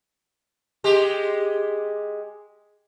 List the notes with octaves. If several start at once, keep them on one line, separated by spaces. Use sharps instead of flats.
G#3 G4